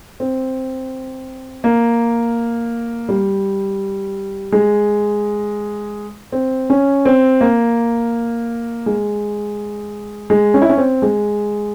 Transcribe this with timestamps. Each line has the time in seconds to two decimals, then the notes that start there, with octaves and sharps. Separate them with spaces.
0.20 C4
1.64 A#3
3.09 G3
4.52 G#3
6.32 C4
6.70 C#4
7.06 C4
7.41 A#3
8.86 G#3
10.30 G#3
10.54 C#4
10.62 E4
10.69 C#4
10.78 C4
11.02 G#3